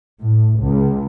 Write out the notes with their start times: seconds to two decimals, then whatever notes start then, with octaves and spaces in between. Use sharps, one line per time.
0.23 A2
0.60 C#2